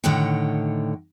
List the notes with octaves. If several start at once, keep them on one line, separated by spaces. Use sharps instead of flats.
A2 D3 D#3 C#5 F#5 G5